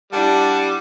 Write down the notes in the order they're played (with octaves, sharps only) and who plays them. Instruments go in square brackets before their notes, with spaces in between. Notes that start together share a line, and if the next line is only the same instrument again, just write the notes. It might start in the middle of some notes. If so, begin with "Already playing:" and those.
[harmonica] G3 [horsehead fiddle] D4 E4 [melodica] F#5 A5